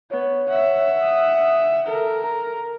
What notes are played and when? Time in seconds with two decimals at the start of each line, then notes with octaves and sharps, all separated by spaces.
0.11 B3 C#5
0.48 E5 F#5
1.01 D#6
1.87 A4 A#4
2.24 A#5